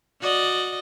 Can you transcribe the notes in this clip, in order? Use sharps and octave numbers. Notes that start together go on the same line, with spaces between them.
F#4 D5 D#5